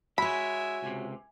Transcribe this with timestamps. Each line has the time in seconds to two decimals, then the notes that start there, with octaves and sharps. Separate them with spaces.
0.18 G#3 E4 F#4 C#5 E5 G#5 B5
0.82 C#2 C3